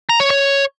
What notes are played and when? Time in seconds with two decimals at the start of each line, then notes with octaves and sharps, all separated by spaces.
0.09 A#5
0.20 C#5
0.30 C#5